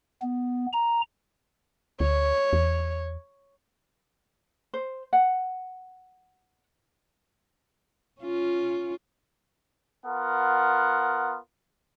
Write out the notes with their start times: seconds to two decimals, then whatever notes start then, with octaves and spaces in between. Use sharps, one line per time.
0.22 B3
0.73 A#5
2.00 D2 C#5
2.53 E2
4.74 C5
5.13 F#5
8.21 C#4 F4
10.05 B3 F4 A#4 F#5